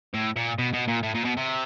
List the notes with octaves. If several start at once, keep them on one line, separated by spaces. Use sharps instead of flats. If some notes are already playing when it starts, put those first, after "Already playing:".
A2
A#2
B2
B2
A#2
A2
A#2
B2
C3